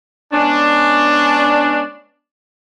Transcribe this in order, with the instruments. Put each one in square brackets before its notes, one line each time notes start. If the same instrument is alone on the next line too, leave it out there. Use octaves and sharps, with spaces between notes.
[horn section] G#3 B3 C#4 D4